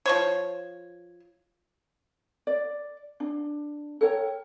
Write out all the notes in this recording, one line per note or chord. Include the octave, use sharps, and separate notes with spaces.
F3 C5 C#5
D5
D4
A4 A#4 C#5 G5